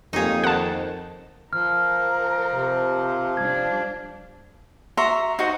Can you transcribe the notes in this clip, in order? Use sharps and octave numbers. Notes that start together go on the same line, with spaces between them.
F2 A#3 D#4 G4 G#4 C#5
D#3 A#3 C4 F#5 A5
F3 A#4 F6
C3
G3 D4 G#6
F#4 E5 A#5 C6
D#4 F#4 C5